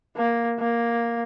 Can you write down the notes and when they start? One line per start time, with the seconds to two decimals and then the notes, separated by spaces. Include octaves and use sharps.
0.17 A#3
0.59 A#3